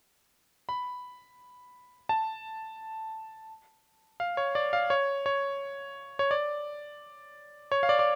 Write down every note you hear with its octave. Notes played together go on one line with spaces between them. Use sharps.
B5
A5
F5
C#5
D5
F5
C#5
C#5
C#5
D5
C#5
F5
D5
D5